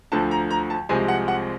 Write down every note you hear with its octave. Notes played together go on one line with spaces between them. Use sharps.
D2 D3 F3 A5
A#5
A#5
A5
C2 C3 F3 G#3 C4 G#5
F#5
F#5